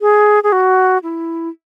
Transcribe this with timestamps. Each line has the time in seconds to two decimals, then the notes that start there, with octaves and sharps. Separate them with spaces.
0.01 G#4
0.43 G#4
0.52 F#4
1.03 E4